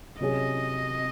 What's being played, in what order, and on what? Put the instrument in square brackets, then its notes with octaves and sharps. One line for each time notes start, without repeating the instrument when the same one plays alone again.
[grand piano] C3 F#3 C#4 G#4 [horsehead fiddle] D#5